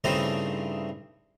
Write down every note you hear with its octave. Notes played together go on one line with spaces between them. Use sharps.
G2 C#3 A3 C4 D#4 E4